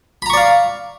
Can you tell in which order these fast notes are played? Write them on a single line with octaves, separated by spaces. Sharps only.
B5 A#5 C#6 D5 F5